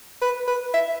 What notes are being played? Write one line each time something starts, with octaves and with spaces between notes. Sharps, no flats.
B4
B4
E5